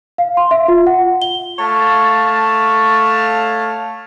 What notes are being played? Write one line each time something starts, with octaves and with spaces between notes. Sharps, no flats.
F5
C6
E5
F4
F#5
G7
A3 C#5 F5 A5